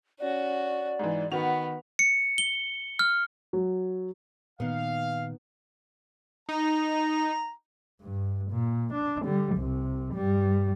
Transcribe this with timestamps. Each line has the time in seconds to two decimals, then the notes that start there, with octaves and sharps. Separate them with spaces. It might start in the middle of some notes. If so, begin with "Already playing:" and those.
0.20 C#4 F#4 D5
0.99 G#2 E3
1.32 D#3 B3 F#4 F#5 F7
1.99 C#7
2.38 G7
2.99 F6
3.53 F#3
4.60 A#2 D#3 B3 D#4 F5
6.49 D#4 A#5
8.02 G2
8.52 A#2
8.94 D4
9.25 D3 G3
9.56 C2 C3
10.14 G2 G3